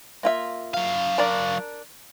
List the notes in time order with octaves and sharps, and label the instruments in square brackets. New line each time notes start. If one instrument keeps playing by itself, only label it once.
[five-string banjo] A#3 F4 E5
[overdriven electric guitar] F#3 F5
[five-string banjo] D4 A#4 D5